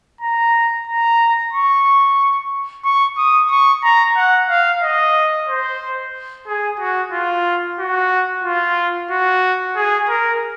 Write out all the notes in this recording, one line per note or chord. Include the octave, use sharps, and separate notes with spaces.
A#5
A#5
C#6
C#6
D#6
C#6
A#5
F#5
F5
D#5
C5
G#4
F#4
F4
F#4
F4
F#4
G#4
A#4